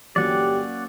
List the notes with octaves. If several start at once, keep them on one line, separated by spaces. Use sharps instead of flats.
G1 F#3 A#3 C#4 G4 D5 F#5